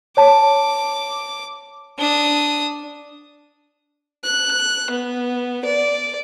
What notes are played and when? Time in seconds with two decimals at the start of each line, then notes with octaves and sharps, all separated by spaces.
0.17 C#5 A5 D6
1.99 D4 D#6
4.24 F#6
4.90 B3
5.65 D5